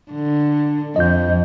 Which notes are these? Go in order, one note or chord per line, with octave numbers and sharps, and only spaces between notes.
D3
F2 D#5 G6